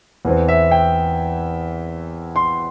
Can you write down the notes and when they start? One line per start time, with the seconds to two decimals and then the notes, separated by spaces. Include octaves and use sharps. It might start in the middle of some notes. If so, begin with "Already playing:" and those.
0.25 E2 E3 C4
0.48 E5
0.71 G5
2.36 C6